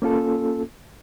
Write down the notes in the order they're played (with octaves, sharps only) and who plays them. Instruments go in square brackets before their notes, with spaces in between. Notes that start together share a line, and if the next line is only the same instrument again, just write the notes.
[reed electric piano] A#3 C#4 F4 A4